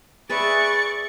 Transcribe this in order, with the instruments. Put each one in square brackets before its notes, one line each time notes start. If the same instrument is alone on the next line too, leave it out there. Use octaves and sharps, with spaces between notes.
[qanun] G#4 B4 E5 [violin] D5 C#6 [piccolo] A6